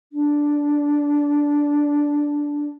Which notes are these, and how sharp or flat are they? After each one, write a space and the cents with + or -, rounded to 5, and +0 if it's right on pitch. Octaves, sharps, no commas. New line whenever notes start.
D4 -10